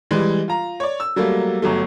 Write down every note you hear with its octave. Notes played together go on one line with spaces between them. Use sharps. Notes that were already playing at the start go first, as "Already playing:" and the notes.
E3 G3 G#3
F4 A#5
C#5 D5
E6
F#3 G3 A3 A#3
G1 F#3 A3